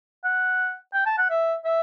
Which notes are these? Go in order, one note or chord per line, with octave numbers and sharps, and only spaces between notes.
F#5
G5
A5
F#5
E5
E5